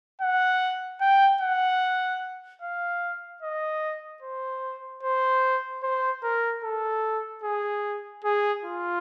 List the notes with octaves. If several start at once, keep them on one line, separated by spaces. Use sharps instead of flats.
F#5
G5
F#5
F5
D#5
C5
C5
C5
A#4
A4
G#4
G#4
F4